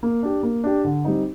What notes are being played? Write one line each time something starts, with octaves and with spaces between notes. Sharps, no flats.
A#3
D4 G4
A#3
D4 G4
D3
G3 C4 D#4